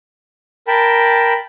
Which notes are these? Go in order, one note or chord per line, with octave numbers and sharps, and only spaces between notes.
A#4 G5 A5 B5